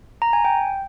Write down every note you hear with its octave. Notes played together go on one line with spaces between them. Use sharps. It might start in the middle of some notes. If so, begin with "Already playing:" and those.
A#5
G#5
G5